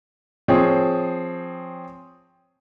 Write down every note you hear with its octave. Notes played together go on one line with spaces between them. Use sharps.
F3 C4 G#4 C#5